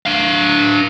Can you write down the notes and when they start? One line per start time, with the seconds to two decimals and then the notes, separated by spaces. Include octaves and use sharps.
0.06 D4 F5